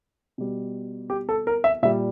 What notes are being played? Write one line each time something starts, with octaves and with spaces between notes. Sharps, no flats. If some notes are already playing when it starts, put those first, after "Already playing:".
B2 G3
G4
A4
A#4
E5
A#2 G3 E5